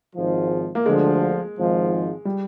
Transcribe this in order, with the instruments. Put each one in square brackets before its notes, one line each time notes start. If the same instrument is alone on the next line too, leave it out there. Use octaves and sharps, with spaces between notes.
[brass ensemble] G#1 G#2 F3
[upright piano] A#3
[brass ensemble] D2 D3 F3 [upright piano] G#3
[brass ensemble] G#1 G#2 F3
[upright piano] G3